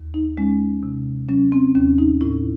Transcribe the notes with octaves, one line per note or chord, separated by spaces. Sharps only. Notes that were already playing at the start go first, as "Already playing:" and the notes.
Already playing: D#2
D#4
G#3 C#4
C3
F#3 C#4
C4
D#2 C#4
D#4
A2 E4